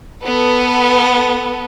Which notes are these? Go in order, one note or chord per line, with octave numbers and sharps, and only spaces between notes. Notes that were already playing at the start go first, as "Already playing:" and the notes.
B3 A4